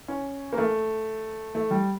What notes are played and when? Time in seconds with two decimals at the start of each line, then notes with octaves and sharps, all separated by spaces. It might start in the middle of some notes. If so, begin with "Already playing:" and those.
0.08 C#4
0.53 A#3
0.58 A3
1.55 A3
1.71 G3